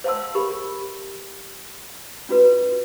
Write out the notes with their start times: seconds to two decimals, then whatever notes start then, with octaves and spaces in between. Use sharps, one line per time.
0.04 C5 F5 F#5 A5 C6 E6
0.35 G4 A#4 B5 C#6
2.29 C#4 F4 F#4 B4